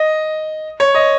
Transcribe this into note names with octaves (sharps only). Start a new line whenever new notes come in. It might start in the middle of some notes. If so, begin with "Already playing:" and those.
Already playing: D#5
C#5
D#5